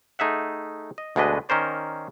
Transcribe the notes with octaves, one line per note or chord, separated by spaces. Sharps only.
A3 D#4 G#4 E5 F#5
D#5
D2 B2 G#3 D4 B4 D#5
D#3 C#4 A#4 C5 D5